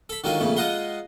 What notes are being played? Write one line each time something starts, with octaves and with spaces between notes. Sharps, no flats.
A4 B5
D3 D#3 F#3 G#3 F4
F2 A#2 C#3 A3
G#3 F4 D#5 F#5 A#5 C6